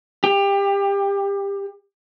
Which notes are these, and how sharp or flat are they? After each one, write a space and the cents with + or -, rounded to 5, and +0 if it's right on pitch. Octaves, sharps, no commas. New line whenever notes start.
G4 +25